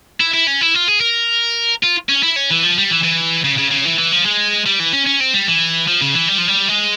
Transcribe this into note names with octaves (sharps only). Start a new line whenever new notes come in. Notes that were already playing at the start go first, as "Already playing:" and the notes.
E4
E4
C#4
E4
F4
G#4
A#4
F4
C#4
E4
C#4
E3
F3
G3
E3
E3
C#3
C#3
C#3
E3
E3
F3
G#3
G3
E3
C#4
C#4
C4
G3
E3
F3
C#3
E3
G3
F3
G3
G#3